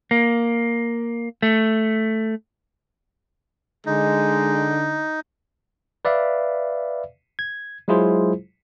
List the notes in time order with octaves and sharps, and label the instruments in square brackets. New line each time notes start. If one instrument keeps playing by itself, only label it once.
[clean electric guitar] A#3
A3
[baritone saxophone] D3 [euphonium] G#3 [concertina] D#4
[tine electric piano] B4 D5 E5 F5
G#6
F#3 G#3 E4 F4 G#4 C5